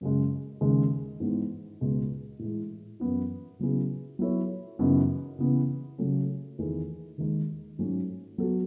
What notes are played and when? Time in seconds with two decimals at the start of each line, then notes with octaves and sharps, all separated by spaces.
0.01 F#2 C#3 G#3
0.61 D#2 C#3 G#3
1.20 G#2 E3 G#3 B3
1.81 C#2 B2 G#3 B3
2.39 A2 E3 G#3
3.00 F#2 E3 B3 E4
3.59 C#3 F#3 B3 E4 G#4
4.19 F#3 B3 E4 A4 C#5
4.79 F#2 C#3 E3 B3 D#4
5.39 C#3 E3 B3
5.98 C#3 F#3 A3 C#4
6.58 E2 D#3 A3 E4 G#4
7.18 D#2 D#3 G#3 D#4
7.78 G#2 F#3 A3 C#4
8.38 F#3 B3 F#4 A4